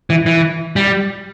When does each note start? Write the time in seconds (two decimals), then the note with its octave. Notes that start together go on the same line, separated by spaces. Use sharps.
0.10 E3
0.26 E3
0.76 G3